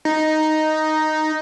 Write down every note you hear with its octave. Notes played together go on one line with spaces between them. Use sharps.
D#4